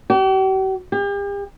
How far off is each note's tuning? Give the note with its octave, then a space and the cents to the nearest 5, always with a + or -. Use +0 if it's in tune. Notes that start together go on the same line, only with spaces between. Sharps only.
G4 -45
G4 +40